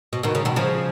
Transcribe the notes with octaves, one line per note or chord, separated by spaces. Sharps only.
B2
B2 D#3
C#3
B2 D#3
C#3 F3